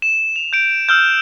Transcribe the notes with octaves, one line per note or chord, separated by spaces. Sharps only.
E7
F7
G6 D7
E6 F6 G6